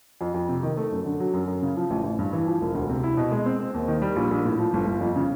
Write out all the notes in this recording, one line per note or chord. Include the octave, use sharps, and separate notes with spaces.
F2
F2
C3
D#3
A3
F#2
D3
F#3
F#2
F#2
C#3
F3
A1
A1
G2
E3
F3
E1
D2
C3
E4
B2
G#3
C4
C4
D#2
D#3
G3
A#1
A#1
A2
F3
G1
G1
F2
C#3